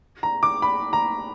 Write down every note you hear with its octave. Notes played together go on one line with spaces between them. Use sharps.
A#5
D6
B5
A#5